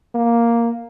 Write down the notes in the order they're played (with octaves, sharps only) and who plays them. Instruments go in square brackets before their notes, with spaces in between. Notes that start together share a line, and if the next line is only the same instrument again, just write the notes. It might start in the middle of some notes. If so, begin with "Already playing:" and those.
[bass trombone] A#3